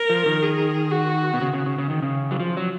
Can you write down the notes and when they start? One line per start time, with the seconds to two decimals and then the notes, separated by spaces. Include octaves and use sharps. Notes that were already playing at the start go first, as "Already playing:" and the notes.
Already playing: A#4
0.10 F3
0.26 D#3
0.43 G#4
0.91 F#4
1.34 B2
1.41 C#3
1.53 C#3
1.66 C#3
1.78 C#3
1.90 D#3
2.02 C#3
2.31 F#3
2.40 F3
2.57 F#3